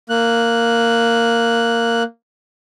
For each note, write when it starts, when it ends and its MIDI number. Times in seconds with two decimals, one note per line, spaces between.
0.10 2.03 58
0.10 2.03 90